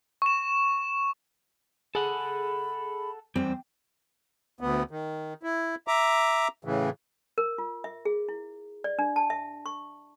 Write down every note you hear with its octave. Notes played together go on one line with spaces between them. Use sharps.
C#6 E7
G#4 A4 F#5 B5
E2 G3 C4
D2 B3
D#3
E4
E5 A#5 D6
A2 C#3 E3
A#4
F4
E5
G#4
E4
D5
D4
A5
E5
C#6